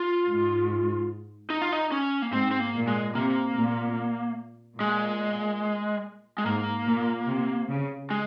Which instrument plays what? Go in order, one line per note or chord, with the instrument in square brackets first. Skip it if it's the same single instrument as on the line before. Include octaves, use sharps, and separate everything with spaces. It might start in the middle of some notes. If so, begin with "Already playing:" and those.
Already playing: [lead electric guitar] F4
[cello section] G#2
[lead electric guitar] D#4
F4
D#4
C#4
A#3
[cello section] G#2 [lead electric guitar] C4
[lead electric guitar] C4
A#3
[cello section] A#2
[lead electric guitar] G#3
[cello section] C3 [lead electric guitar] A#3
[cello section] A#2
[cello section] A#2 [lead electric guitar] G#3
[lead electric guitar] G#3
[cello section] G#2 [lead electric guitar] A#3
[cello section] A#2
C3
C#3
[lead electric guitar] G#3